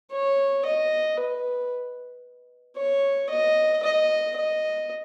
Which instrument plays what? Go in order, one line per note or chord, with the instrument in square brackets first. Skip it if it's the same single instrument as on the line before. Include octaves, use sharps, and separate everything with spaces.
[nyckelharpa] C#5
D#5
B4
C#5
D#5
D#5
D#5